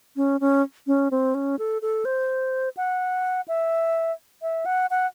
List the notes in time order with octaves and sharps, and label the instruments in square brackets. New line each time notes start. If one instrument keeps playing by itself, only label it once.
[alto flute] C#4
C#4
C#4
C4
C#4
A4
A4
C5
F#5
E5
E5
F#5
F#5